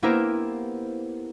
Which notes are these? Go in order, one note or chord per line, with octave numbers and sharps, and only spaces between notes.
A#3 B3 E4 G4 A#4 C5